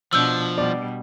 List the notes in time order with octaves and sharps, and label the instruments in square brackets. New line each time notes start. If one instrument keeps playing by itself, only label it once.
[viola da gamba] B2 D4 [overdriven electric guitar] F3 [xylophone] E6 G6
[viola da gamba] B2 G3 [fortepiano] D5